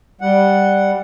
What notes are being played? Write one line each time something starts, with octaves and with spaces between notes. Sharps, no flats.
G3 F#5